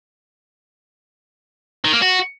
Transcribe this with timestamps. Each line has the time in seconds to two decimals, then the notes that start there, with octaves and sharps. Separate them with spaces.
1.85 D#3
1.93 A#3
2.02 F#4